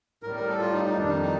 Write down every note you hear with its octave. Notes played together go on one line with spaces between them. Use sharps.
A2 G3 A#4
A#4
A4
F4
D#4
D#4
F2 D#3 G3 D4
D#4
D#4